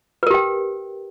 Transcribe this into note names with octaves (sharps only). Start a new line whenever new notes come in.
G4 A#4 B4 G5